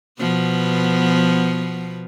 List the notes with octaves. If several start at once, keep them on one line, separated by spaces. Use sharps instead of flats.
B2 F3 B3